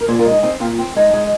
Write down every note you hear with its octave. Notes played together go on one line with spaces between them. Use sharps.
A#4
A#2 G#4 C5
F4 A#4
G#3
D#4 G#4
C4 D#4 G#4
A#2 C4 F4
C4
G#3 D#4
G#3